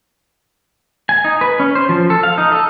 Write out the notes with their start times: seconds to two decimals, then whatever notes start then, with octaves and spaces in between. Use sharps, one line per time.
1.09 G#5
1.25 D#4
1.41 B4
1.60 C#4
1.75 C5
1.89 F3
2.10 A4
2.23 F5
2.38 D#4
2.52 A4